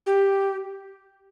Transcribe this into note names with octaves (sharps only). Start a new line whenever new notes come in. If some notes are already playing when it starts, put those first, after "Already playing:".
G4